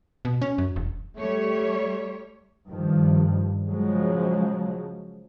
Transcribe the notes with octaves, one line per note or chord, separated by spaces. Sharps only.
B2
C#4
F#2
E1
G3 A3 C#5
G2 D#3 F3
C#3 F3 F#3 G#3